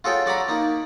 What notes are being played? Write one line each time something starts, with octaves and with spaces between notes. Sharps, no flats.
F4 F#4 G#4 A4 C#5 G5
F#4 D5 F#5 A#5 B5
A#3 D#4